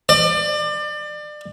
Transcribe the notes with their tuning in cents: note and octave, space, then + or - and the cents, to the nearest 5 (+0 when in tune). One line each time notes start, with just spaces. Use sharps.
D5 +30